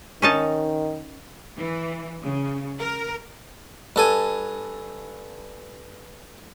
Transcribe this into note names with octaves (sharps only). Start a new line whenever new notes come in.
D#3 C#4 D#4 A5
E3
C#3
A#4
G2 A4 G#5